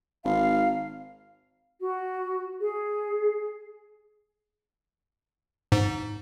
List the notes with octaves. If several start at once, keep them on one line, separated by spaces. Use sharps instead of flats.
G#1 F5
F#4
G#4
G#2